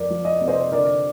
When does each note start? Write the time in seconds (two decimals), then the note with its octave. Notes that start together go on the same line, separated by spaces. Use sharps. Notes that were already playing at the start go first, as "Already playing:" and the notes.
Already playing: F2 A#4 D5
0.10 F3
0.25 D#5
0.41 C3
0.48 C5 D#5
0.72 D3 A#4 D5